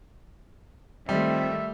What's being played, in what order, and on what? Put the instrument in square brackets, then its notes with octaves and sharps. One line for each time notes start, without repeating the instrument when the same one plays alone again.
[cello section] D#3 A3 F4 [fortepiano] G3 [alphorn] C4 [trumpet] E5